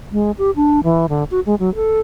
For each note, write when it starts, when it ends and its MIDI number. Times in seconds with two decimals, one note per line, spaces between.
0.12 0.31 56
0.38 0.51 67
0.56 0.80 62
0.84 1.06 52
1.09 1.24 50
1.31 1.40 66
1.46 1.55 56
1.60 1.73 54
1.75 2.00 69